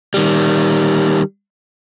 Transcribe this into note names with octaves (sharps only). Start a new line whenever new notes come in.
D#3 G3